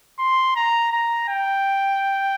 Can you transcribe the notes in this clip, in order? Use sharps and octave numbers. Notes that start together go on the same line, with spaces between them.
C6
A#5
A#5
G5